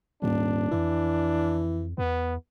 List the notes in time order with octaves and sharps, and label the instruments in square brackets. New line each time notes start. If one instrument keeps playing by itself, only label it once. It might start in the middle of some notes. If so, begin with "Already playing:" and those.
[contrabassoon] D#1 [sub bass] G#2 [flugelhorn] D4
[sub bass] F2 [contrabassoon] E3
[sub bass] E2 [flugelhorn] B3